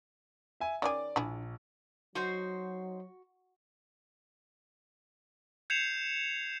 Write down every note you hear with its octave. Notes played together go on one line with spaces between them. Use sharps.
E5 G#5
D#3 C#4 G#4 D5 D6
A#1 D4 E4 G#4
F#3 D#4 F#4 C5 G6
G6 G#6 C7 C#7 E7 F7